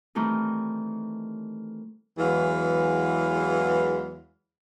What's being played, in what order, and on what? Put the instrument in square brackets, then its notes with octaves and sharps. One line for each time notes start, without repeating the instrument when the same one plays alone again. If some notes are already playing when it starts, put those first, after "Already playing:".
[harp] D#3 E3 G3 A3 C4 D#4
[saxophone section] E2 E3 F#3 G#3 B4 F5